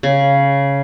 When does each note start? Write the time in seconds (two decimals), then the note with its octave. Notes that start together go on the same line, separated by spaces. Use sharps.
0.03 C#3